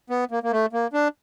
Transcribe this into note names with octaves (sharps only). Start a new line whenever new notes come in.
B3
A#3
A#3
A3
A#3
D4